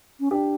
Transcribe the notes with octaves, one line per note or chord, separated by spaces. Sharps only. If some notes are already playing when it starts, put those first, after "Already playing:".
C#4
D4 G4